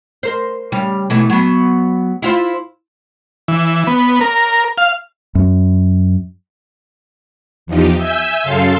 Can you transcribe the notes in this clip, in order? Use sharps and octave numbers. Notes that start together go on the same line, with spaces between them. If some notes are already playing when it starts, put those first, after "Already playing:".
A#4 C5
C#3 G3
B2 E3 A3
F#3 B3
E4 F4 C5
E3
B3
A#4
F5
F#2
E2 F3 D#4 G4
E5 G#5 E6 G6
F#2 C#3 A4 F5 C6